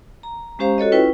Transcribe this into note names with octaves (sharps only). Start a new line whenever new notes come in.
A#5
G#3 C#4 G4 C5 F5 A#5
F#4 A4 C#5 D#5
C#4 E4 F4 B4 G5